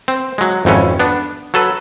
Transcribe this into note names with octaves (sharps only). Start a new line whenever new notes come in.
C4
F#3 G#3
G#1 F2 E3 C#4
B3 D4
F#3 A4 B4